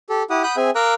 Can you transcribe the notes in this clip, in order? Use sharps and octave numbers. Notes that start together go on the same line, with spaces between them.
G4 A4
E4 G4 F#5 D#6
F#5 B5 D#6 F#6 G6
C4 G#4 E5 G#5
A#4 F5 A#5 D6 E6 F#6